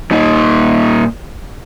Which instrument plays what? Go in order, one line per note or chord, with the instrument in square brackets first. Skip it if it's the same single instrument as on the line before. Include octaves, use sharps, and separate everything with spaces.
[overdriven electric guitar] A#2 D#4